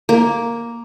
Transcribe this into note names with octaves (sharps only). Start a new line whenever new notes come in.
A#3